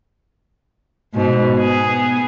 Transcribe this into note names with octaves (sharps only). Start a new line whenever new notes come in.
G#2 B2
B3 G#4